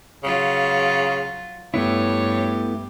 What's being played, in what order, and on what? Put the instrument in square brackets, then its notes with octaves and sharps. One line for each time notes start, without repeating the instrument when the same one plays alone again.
[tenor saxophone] C#3 [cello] F#3 F4
[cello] G2 G4 [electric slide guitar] A3 B3 E4 [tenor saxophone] C#5